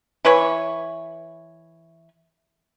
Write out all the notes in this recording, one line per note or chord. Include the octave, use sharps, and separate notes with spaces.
E3 B4 C#5